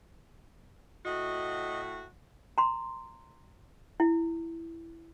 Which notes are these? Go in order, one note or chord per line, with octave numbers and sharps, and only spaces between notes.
A2 F#4 D#5
A#5 C6
E4